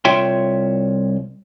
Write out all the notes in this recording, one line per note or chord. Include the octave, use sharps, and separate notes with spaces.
C2 F4 C#5 E5 G5 C6